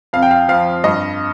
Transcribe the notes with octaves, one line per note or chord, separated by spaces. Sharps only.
F2 F5
G5
F5
F3 F5
G2 D#5